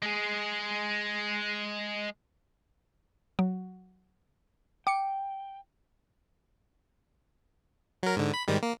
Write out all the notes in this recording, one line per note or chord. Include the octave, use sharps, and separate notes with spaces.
G#3 G#4
F#3
G5 D6 C#7
F#3 A#4
G#2 D3
B5
G#2 D#3 G3
A#3